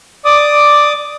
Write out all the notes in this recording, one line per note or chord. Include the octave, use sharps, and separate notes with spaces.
D5 D6 D#6